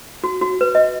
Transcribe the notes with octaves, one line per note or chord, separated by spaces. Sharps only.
F#4
F#4
B4
D#5